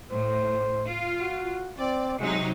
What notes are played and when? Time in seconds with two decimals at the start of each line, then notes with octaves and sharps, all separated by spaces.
0.12 A2 C5
0.88 F4
1.21 F#4
1.78 C4 D5
2.20 C3 F#3 G#3 D#4